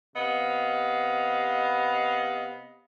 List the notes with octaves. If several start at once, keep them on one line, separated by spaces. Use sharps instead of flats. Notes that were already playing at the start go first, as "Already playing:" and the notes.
C3 B3 D#5 F5